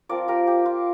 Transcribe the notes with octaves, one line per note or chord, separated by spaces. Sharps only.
F3 C4 F4 A#4 D5
G4 A#4
G4
F4